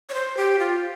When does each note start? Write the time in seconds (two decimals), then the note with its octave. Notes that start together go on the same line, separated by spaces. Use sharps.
0.09 C#5
0.14 C5
0.37 G4
0.59 F4